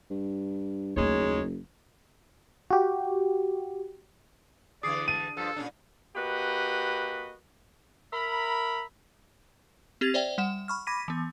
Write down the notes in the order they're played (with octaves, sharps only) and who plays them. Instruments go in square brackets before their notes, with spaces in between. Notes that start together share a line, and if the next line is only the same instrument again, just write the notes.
[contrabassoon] G2
[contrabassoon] F#1 [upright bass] D#2 A3 [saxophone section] G#3 D#4 C#5
[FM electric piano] F#4 G4
[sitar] D3 E3 G#4 [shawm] D5 [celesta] D#6 C7
[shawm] A5 [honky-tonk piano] D#7
[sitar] G2 F3 [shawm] A4
[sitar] A#2 C#4 D4
[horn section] A#3 F#4 G4 B4 D#5 B5
A#4 E5 A#5 B5
[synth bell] C4 G4 G#6 A6 F7
C5 D5 E5 G5
G3 F#5 E7
B5 C#6 F6
B5 D6 G#6 A#6 B6 D#7
E3 B3